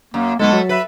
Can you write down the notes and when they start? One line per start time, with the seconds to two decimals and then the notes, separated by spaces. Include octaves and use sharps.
0.14 F#2 A#3
0.39 B1 G#3 A3 B3 A4
0.53 F#3
0.69 B4 E5